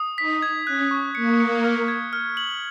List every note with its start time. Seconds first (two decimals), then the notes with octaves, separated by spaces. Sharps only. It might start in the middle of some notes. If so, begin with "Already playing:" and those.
Already playing: D#6
0.18 D#4 B6
0.42 G#6
0.66 C#4 F#6
0.91 C#6
1.15 A#3 C#7
1.40 C#7
1.64 F6
1.88 G#6
2.13 F6
2.37 F#7